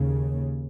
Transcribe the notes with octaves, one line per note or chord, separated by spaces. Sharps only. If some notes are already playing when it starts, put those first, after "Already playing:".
Already playing: D#2 C#3